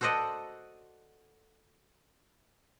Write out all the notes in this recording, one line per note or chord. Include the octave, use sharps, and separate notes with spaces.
F#4 A4 C5 D5 D#5 F#5